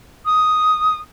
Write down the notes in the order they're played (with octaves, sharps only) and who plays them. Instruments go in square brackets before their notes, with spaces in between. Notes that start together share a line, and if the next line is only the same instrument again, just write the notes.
[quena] D#6